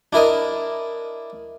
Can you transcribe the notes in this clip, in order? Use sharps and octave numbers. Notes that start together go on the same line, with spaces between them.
D4 E4 A#4 D#5